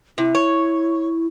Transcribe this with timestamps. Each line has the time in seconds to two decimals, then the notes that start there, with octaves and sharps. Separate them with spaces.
0.18 C3 E4
0.35 C#5